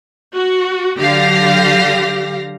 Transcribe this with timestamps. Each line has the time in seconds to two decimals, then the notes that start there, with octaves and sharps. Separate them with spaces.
0.35 F#4
0.99 D3 F#3 G4 F5 A#6